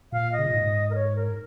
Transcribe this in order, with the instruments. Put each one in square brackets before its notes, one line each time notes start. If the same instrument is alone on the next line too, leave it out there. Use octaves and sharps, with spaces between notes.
[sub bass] A#2 [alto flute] F5
[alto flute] D#5
[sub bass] C#3
A#2
G#2
[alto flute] A#4
C#5
A#4